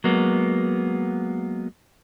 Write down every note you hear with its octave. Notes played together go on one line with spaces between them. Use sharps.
F#3 G#3 A#3 B3